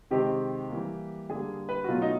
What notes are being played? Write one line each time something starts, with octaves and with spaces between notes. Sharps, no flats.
C3 D#3 G#3 C4 G4
E3 G3 A#3
D3 G3 A#3 G#4
B4
F#4
B2 F#3 A3 F4
D#4